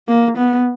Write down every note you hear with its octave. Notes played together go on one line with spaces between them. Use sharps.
A#3
B3